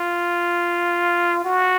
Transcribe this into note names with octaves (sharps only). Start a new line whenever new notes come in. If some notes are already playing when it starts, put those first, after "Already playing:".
Already playing: F4
F#4